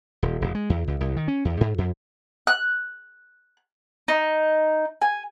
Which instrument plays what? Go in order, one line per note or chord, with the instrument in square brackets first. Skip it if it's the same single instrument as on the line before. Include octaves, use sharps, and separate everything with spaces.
[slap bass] D#1
E1
G#3
E2
C#2
C2
D#3
C#4
E2
G#2
F2
[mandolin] F#6
D#4
G#5